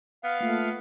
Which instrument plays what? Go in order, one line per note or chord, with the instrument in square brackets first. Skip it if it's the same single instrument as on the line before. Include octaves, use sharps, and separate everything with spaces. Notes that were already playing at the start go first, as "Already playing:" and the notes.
[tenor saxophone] B3 [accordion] F5
[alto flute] A3 [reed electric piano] A#3 F4